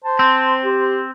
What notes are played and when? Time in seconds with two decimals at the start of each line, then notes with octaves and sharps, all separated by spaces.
0.04 C5 A5
0.19 C4
0.64 G4
0.79 C5